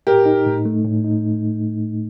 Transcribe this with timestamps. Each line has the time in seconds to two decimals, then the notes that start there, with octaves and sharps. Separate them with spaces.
0.07 A2 G4 A#4
0.26 D#4
0.46 A2
0.65 A3
0.85 A2
1.04 D#4